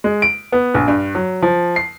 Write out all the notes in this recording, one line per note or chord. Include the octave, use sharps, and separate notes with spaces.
G#3
D7
B3
A#1
G2
F#3
F3
C7